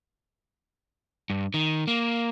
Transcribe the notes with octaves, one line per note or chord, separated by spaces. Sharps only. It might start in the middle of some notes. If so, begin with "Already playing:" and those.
G2
D#3
A#3